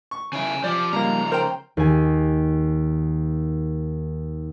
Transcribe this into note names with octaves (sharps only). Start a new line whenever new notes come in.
C#6
C#3 E4 F5 G#5
F3 G4 C5 D5
C#3 F3 G3 A#3 A#5
A#4 C5 G5
D#2 G#5